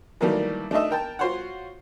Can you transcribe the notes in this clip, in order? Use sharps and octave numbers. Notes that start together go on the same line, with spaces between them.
D#3 E3 F#3 G3 A3 A#3
A3 D4 D#4 D#5 E5
A#4 G5 A5
F4 F#4 C5 C#5 F#5